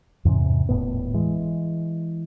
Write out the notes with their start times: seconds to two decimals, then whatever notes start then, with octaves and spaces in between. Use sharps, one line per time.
0.25 E2 G#2 C3 C#4
0.69 D#1 C2 A2 B3
1.14 E3 G#3